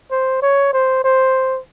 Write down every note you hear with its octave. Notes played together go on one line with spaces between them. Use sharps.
C5
C#5
C5
C5